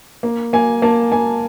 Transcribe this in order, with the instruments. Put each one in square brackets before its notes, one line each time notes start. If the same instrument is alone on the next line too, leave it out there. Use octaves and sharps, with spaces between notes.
[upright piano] A#3
A#3 G#5
A#3 A5
A#3 G#5